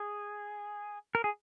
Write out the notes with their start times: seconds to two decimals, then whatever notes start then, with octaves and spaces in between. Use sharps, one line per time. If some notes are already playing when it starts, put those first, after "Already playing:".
Already playing: G#4
1.15 A#4
1.24 G#4